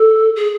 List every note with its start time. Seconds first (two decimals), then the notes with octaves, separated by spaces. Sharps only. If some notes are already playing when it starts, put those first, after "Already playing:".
Already playing: A4
0.36 G#4